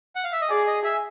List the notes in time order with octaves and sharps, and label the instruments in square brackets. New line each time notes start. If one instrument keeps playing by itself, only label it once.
[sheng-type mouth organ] F#5
F5
E5
D#5
[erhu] G#4 [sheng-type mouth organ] D5
[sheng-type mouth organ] D#5
E5